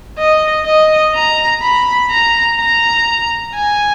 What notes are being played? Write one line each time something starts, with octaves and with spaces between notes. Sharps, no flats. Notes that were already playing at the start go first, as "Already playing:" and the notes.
D#5
D#5
A#5
B5
A#5
A#5
G#5